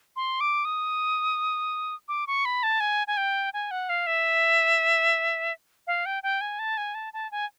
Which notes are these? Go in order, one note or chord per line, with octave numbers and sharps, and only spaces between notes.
C6
D6
D#6
D6
C#6
B5
A5
G#5
G#5
G5
G#5
F#5
F5
E5
F5
G5
G5
G#5
A5
G#5
A5
A5
G#5